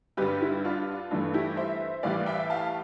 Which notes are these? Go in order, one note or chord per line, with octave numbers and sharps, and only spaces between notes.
G2 D3 G3 G4 B4
E4 G4
D4 F4
G2 E3 A3 D4
E4 G4
C5 E5
A2 E3 G3 D5 F5
E5 G5
F5 A5